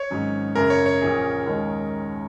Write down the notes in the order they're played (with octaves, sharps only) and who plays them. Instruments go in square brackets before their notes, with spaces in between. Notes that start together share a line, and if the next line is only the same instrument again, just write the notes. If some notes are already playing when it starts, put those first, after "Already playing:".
Already playing: [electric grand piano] C#5
[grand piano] G#1 G#2 F#3 C#4
[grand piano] F#2 C#3 A#3 [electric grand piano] A#4
[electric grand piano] C#5
C#5
[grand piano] A#1 A#2 A#3 C#4 G#4
D#2 D#3 G#3 C#4